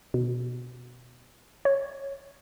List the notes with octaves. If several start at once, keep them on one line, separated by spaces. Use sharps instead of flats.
B2
C#5